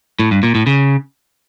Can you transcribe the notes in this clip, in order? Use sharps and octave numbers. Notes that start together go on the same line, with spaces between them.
A2
G2
A#2
A2
C#3